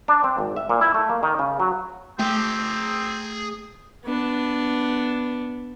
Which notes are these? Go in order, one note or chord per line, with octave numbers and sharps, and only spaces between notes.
D4
C4
G#1
E5
A#2
E4
A3
A#3
D#3
C#3
F#3
A3 C4 G#4 G5
B3 D4